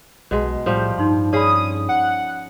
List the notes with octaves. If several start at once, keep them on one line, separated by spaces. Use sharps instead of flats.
B1 B2 G#3
A2 F3 G3 G4
G2 D#4 C6
C#4 G#4 D5 B5 D#6
F#5